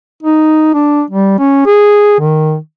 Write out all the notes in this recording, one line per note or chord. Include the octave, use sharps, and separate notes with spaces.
D#4
D4
G3
C#4
G#4
D#3